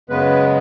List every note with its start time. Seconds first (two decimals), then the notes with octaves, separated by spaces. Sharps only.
0.10 F#2 C#3 G#3 B3 B4